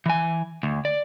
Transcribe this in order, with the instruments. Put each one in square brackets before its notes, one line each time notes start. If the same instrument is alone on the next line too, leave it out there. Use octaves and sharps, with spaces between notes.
[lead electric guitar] E3 G#5
D2
D5